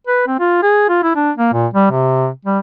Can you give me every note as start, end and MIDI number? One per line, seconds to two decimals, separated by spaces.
0.07 0.27 71
0.27 0.38 60
0.39 0.60 65
0.63 0.87 68
0.89 1.02 65
1.03 1.11 64
1.16 1.31 62
1.38 1.51 58
1.53 1.67 46
1.74 1.87 55
1.91 2.28 48
2.45 2.59 55